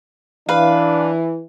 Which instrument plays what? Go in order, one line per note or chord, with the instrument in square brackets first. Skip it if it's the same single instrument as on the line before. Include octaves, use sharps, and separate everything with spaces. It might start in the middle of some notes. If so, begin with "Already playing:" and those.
[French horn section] E3 [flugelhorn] D4 [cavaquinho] B4 F5